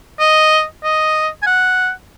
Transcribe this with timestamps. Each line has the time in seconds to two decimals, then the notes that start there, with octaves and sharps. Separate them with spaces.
0.20 D#5
0.84 D#5
1.42 G#5
1.47 F#5